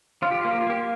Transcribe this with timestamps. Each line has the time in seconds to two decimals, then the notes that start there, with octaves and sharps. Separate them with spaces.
0.22 F3 F4
0.31 G4
0.41 A#3 F4
0.51 G4
0.61 F4
0.67 A#3 G4